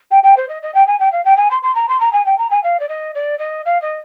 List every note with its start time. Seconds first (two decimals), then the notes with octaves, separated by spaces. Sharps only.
0.11 G5
0.23 G5
0.36 C5
0.48 D#5
0.62 D#5
0.74 G5
0.87 G#5
0.99 G5
1.12 F5
1.25 G5
1.37 G#5
1.50 C6
1.62 C6
1.75 A#5
1.88 C6
2.00 A#5
2.13 G#5
2.25 G5
2.38 A#5
2.50 G#5
2.63 F5
2.79 D5
2.88 D#5
3.14 D5
3.39 D#5
3.65 F5
3.81 D#5